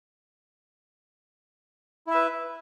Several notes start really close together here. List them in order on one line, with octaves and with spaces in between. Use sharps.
E4 E5 B4